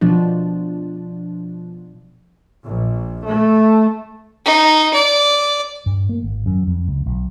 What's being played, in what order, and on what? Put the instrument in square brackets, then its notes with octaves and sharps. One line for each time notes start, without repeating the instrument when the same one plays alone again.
[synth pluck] B2 F3 D4
[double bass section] A#1
A3
[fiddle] D#4
D5
[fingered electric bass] G2
A#3
G#1
F#2
F2
C#2
B1